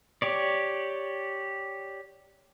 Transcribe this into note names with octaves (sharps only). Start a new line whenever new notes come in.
G4 C#5 D5